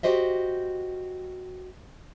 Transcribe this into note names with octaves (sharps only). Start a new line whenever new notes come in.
F#4 G4 C5 D#5 E5